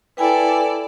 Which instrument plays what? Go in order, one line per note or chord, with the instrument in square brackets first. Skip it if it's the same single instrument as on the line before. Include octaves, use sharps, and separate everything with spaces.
[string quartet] E4 A4 D5 [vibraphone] B4 G5 G#5